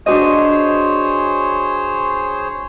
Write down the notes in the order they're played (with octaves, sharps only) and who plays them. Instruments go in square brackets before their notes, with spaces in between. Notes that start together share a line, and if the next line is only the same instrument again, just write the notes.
[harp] D4 F#4 D#5 [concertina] G#4 C5 C#5